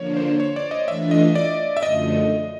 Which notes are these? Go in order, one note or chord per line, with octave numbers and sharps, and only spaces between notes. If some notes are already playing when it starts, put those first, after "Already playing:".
Already playing: D3 F3 A#3 D4 C#5
C5
C#5
D5
D#5
E3 A3 D4 F4 E5
D#5
D5
E5
F#2 D3 F3 A3 D#5